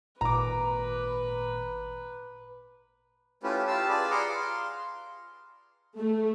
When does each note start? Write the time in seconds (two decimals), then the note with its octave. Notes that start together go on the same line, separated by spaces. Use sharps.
0.21 G#1 A#2 B4 A#5 D6
3.43 A3 C#4 E4 F4 G4 B4
3.67 F4 G4 F5 A5 E6
3.88 F4 G#4 B4 D5
4.11 G#4 F#5 A#5 C6 D6
4.29 F5 C6
5.97 A3